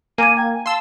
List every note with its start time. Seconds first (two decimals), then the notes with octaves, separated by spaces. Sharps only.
0.18 A#3 G#5 D6 G#6 D#7
0.37 G5 A#5 G#6
0.54 G#5
0.66 F5 A5 C6 E6